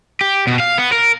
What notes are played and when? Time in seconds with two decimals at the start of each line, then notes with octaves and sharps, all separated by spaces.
0.21 G4
0.47 B2
0.60 F5
0.78 B3
0.92 A#4